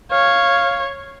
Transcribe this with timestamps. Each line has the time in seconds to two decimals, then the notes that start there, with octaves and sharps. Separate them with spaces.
0.11 C#5 F5